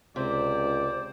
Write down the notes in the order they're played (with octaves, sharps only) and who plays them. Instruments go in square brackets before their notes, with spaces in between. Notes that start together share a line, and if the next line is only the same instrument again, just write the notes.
[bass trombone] C#2 [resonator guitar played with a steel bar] C3 [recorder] C5 [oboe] D5